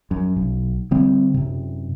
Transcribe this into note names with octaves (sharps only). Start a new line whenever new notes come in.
F#2
B1
D3 G3 C4
F#2 C3